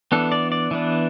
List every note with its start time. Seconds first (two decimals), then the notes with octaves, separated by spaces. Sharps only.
0.12 E3 B3 D4 A4
0.32 D5
0.52 D5
0.71 E3 B3 D4